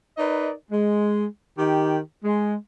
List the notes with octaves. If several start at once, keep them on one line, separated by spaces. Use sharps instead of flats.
D#4 A#4 B4 D5 D#5
G#3
D#3 G4
G#3